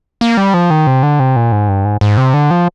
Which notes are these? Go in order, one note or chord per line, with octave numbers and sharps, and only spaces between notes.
A#3
G3
F3
D#3
C3
D3
C3
A#2
G#2
G2
G#2
G#2
C3
D3
F3